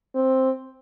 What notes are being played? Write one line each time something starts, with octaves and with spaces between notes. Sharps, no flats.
C4